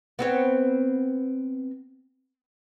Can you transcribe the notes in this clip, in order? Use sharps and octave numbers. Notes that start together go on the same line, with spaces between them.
B3 C4 C#5